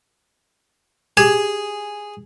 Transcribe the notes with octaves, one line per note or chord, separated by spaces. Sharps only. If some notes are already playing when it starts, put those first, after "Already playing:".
G4 G#4 G#6